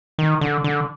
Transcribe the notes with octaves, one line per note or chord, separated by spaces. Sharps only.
D#3
D3
D3